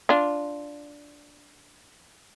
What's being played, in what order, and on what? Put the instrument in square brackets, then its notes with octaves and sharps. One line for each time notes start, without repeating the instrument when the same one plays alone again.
[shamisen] D4 F4